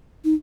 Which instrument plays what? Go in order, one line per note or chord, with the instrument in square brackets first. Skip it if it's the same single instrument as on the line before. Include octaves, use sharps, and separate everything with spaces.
[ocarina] D#4